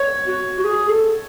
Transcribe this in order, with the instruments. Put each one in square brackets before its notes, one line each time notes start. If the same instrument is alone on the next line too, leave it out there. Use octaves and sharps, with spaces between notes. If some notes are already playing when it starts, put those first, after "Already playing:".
Already playing: [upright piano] C#5
[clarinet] F#4
F#4
G#4
A4